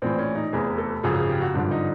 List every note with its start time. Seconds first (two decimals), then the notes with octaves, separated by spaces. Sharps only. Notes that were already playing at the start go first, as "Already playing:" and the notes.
0.02 A#1 A2 E3 C4
0.19 C#4
0.35 D#4
0.53 F1 E2 C3 G#4
0.78 A4
1.03 G#1 F#2 C#3 F3 G#4
1.16 G#4
1.29 G4
1.41 F#4
1.54 G#1 G2 D3 F3 D4
1.71 D#4